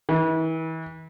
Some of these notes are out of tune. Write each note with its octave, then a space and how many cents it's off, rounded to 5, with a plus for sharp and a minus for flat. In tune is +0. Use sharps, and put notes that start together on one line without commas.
E3 -35